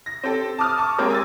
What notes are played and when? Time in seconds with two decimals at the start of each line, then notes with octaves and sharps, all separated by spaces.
0.06 A#6
0.24 C4 G4 A4
0.58 A5 D6 D#6 F6
0.78 A5 C#6 D6
0.98 G#3 A#3 C4 G4 A#4
1.11 G#5 E6 A6